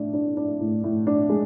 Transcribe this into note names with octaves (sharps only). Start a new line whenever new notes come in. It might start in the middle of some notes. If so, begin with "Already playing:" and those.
Already playing: A2 D4
D4
D4
A2
A2
D4
G#3